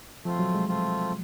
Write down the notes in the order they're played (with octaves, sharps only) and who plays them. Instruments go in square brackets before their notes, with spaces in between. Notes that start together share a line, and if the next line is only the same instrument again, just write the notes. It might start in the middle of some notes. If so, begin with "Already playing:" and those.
[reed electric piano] F3 [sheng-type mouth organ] A3 C4 F4
[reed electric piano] F#3
G#3
[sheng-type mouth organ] A3 C4 F4